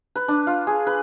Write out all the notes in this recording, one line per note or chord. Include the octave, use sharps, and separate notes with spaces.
B4
D4
F4
G#4
B4